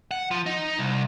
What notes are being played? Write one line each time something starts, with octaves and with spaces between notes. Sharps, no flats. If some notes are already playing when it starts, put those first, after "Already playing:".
F#5
F3
D#4
C2